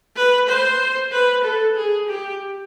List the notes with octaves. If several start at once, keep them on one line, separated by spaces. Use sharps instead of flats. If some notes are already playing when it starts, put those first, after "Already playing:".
B4
C5
B4
A4
G#4
G4